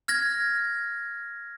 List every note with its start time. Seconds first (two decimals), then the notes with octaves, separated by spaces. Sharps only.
0.08 F6 G#6 A#6